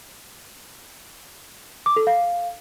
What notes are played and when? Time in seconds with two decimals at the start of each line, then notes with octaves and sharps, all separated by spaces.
1.86 D6
1.96 A4
2.07 F5